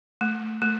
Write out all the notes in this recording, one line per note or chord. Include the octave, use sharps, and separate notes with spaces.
A3
A3